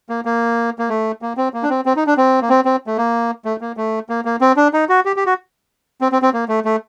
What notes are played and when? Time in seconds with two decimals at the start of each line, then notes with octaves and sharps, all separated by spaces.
0.09 A#3
0.25 A#3
0.79 A#3
0.89 A3
1.22 A#3
1.37 C4
1.54 A#3
1.63 D4
1.70 C4
1.86 C4
1.96 D#4
2.07 D4
2.17 C4
2.42 A#3
2.49 C4
2.65 C4
2.87 A3
2.97 A#3
3.45 A3
3.61 A#3
3.77 A3
4.09 A#3
4.25 A#3
4.41 C4
4.57 D4
4.73 D#4
4.89 F#4
5.05 G4
5.16 G4
5.26 F#4
6.01 C4
6.12 C4
6.22 C4
6.33 A#3
6.49 A3
6.65 A3